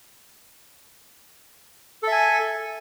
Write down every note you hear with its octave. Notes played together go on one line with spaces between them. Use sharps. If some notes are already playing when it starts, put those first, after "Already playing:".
A4 E5 G#5